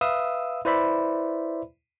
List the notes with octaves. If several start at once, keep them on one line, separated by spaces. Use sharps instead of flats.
B4 E5 F5 D#6 E6
E4 B4 C5 D5 E5 B5